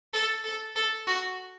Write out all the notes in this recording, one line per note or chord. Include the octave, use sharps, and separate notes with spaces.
A4
A4
A4
F#4